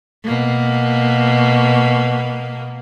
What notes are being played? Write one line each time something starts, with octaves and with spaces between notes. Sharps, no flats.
B2 A#3